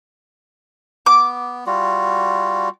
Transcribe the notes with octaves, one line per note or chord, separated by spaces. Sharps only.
B3 D6
G3 F4 F#4